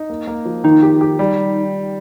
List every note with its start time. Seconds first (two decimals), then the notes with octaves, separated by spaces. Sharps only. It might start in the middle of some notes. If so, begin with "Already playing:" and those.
Already playing: D#4
0.10 A#3
0.27 A#3
0.45 F3
0.64 D#3 D#4
0.82 G4
1.01 G4
1.19 G3